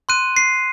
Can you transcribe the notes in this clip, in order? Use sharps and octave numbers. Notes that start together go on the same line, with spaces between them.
C6 F#6 D#7
C7